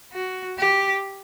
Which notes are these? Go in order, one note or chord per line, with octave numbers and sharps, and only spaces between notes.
F#4
G4